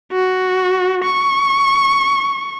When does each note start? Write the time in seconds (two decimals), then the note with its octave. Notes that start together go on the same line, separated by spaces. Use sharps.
0.12 F#4
1.04 C#6